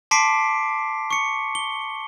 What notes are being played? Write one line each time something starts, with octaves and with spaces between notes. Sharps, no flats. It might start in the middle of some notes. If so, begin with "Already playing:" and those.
A5 C6 D6 B6 C7 D7
C#6 C#7
G7